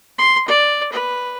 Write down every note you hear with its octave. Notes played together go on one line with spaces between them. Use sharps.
C6
D5
B4